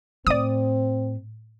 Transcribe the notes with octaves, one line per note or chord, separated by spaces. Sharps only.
A2 C4 D5 D#6